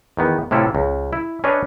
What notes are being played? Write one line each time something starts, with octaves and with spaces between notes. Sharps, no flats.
E2 D#3 B3
A2 C3 C#4 E4 F4 A4
C#2
E4
C#4 D4 B4 C#5 D#5